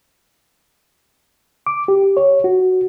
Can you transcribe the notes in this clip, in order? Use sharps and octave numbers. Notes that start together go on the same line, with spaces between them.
D6
G4
C#5
F#4